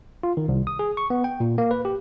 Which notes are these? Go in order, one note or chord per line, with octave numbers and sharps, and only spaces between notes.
F4
D#3
C2
D#6
G#4
C#6
B3
G5
A#2
A#3
B4
G4